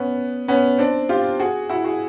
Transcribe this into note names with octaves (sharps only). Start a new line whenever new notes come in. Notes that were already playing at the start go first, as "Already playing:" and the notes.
Already playing: B3 C#4
B3 C#4
C4 D4
F4 G4
F#4 G#4
E4 F#4
F#4 G#4